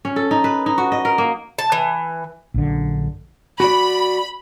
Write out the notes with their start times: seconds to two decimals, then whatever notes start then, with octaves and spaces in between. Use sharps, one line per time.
0.05 C#4
0.16 A4
0.31 D#4
0.44 B4
0.66 D#4
0.78 F#4
0.92 D#5
1.05 A#4
1.18 A#3
1.59 A5
1.72 E3
2.54 A#1 F#2 D3
3.60 F#4 D5 B5